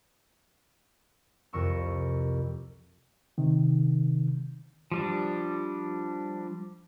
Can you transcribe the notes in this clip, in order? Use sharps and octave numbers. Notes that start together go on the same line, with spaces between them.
C2 F2 A#4 C#6 E6
C3 D#3
F3 G3 D4